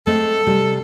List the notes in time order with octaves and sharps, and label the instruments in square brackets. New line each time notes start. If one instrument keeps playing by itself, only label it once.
[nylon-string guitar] G#3 A3 C4 [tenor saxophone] A4
[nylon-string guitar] C3 G3